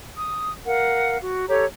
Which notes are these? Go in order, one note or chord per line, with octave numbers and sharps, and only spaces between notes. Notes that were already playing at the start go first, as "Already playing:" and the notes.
D#6
A#4 F5 F#5
F#4
G4 A4 C#5 A#5